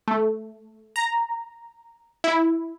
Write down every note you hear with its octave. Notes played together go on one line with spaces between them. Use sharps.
A3
A#5
E4